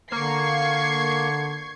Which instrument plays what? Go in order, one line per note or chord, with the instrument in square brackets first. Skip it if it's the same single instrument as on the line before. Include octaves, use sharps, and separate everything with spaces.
[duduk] D3 [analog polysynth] A#3 [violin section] C#6 G#6 C7